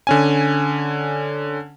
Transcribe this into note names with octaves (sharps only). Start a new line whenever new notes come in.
D3 C#4 G#5